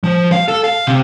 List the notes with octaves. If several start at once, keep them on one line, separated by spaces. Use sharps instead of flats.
F3
F5
A4
F5
C3